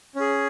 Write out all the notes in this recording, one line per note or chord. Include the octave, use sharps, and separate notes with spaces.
C#4 G#4